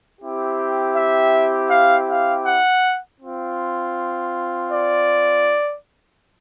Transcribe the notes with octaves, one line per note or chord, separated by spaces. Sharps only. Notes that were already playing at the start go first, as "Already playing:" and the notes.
C4 E4 G4
E5
F5
F5
F#5
C4 F4
D5